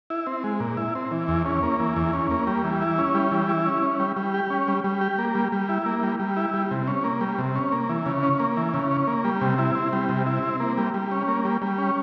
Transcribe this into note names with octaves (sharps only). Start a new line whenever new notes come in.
E4
C4
G#3
A#2
E4
C4
E3
E2
C#4
A#3
E3
E2
C#4
A#3
G3
E3
E4
C#4
G3
E3
E4
C#4
C#4
G3
G3
G4
C#4
G3
G3
G4
A#3
G3
G3
E4
A#3
G3
G3
E4
G3
C3
C#4
A#3
G3
C3
C#4
A#3
E3
C#3
C#4
A#3
E3
C#3
C#4
A#3
G3
C3
E4
C4
G3
C3
E4
C4
A#3
G3
G3
C#4
A#3
G3
G3
C#4